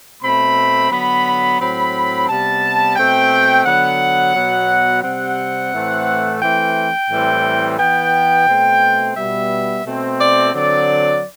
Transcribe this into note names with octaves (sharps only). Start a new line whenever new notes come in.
B2 A3 C4 B5
D3 F#3 B3 B5
A2 F#3 C4 B5
C3 G3 B3 A5
B2 A3 C4 G5
D3 F#3 B3 F#5
B2 F#3 B3
C3 G3 C4 F#5
A2 E3 A3 C4
E3 A3 C4 G5
A2 E3 G3 C4
E3 B3 G5
B2 A3 C4
B2 G3 B3 E5
B2 A3 C4
D5
D3 F#3 C4 D5